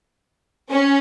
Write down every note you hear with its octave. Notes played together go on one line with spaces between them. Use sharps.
C#4